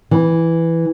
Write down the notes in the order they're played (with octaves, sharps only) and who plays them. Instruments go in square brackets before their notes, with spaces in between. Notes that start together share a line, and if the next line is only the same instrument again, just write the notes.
[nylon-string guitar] E3